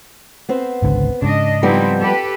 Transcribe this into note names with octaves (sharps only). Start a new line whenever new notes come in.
B3 C4 C5
G#1 C#2 D3
G#2 C#3 D4 D#5
F3 G3 B3 C4 D#4 E4
G4 A4 B4